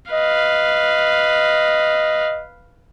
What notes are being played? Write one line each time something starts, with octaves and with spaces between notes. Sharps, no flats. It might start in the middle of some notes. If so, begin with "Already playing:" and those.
B4 D#5 F5